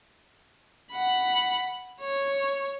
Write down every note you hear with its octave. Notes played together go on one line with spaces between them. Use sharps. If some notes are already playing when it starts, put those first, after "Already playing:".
F#5 B5
C#5